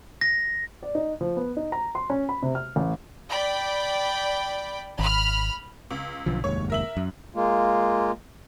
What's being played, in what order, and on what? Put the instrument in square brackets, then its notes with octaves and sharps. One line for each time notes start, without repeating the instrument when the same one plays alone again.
[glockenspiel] A#6
[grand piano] D5
D#4
F3
B3
D#4
A#5
C6
C#4
B5
C3
F6
A1
[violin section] D5 G5 B5
[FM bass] G#1 [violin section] B5 F6
[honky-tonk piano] C#2
[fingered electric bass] B1 D3 F3
[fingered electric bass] F1 D#2 G#2 [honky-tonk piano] C#5
[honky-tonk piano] A#4 E5 F#7
[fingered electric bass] F#2
[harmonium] G#3 A#3 F4